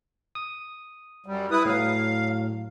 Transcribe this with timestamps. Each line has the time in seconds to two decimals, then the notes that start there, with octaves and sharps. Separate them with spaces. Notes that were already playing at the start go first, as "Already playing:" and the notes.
0.35 D#6
1.26 F#2 G3
1.51 E4 B4 D#6
1.65 A2 F#3 F5